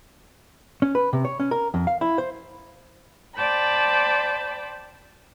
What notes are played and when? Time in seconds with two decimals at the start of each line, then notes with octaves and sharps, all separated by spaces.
0.82 C#4
0.95 B4
1.13 C3
1.25 C#5
1.40 C#4
1.51 A#4
1.74 F2
1.87 F5
2.01 E4
2.18 C5
3.35 C5 D5 G5 A5 B5